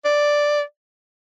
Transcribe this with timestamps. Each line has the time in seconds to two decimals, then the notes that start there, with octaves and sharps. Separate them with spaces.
0.05 D5